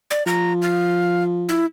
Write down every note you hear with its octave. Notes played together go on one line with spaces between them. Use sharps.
D5
F3 A#5
F5
E4